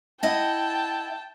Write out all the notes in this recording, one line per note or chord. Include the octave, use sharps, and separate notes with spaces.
E4 D#5 F#5 G5 A5